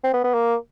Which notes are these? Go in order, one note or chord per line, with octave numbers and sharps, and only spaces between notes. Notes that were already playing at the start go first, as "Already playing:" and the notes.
C4
B3
B3
A#3